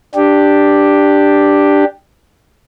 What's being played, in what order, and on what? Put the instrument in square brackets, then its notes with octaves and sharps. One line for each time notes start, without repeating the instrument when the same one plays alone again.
[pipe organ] D4 G4